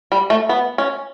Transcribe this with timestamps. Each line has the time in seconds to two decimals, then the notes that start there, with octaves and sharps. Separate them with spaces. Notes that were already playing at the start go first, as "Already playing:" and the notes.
0.12 G3
0.30 A3
0.49 B3
0.78 C#4